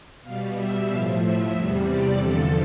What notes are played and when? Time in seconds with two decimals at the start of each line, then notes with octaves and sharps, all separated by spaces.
0.23 B2 G3 F5
0.56 E5
0.87 A2 F3 F5
1.19 E5
1.52 E2 C3 G3
1.84 D5
2.16 E2 D3 F3 A4